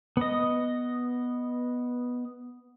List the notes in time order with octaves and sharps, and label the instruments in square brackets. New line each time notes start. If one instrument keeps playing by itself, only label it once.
[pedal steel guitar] B3 D#5